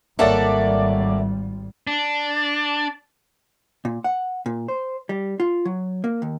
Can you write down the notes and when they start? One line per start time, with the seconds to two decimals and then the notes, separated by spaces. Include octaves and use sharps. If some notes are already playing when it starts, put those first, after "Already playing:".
0.19 G#1 G3 A#3 A4 C#5 D5 E5 F#5
1.87 D4
3.85 A#2
4.04 F#5
4.46 A#2
4.68 C5
5.09 G3
5.40 F4
5.65 F#3
6.04 A#3
6.22 D#2